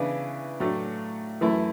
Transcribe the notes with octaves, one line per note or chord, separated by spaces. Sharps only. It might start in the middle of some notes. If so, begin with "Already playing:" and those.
Already playing: C#3 E3 B3 D4
A2 F#3 A3 D4
F#2 E3 A3 E4